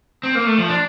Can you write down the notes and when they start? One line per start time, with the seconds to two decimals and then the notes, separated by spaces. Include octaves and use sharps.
0.23 C4
0.35 A#3
0.46 A3
0.58 F3
0.69 D4